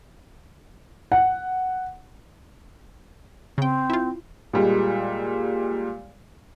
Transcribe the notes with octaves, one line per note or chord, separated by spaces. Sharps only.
F#5
C#3 C4 G5
E4 F4
A#2 G3 G#3